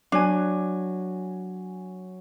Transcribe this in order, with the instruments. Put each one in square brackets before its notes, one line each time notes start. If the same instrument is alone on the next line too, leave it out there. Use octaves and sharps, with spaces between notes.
[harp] F#3 G#5 [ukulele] D4